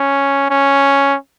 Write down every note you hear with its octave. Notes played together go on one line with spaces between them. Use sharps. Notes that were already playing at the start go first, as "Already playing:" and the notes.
Already playing: C#4
C#4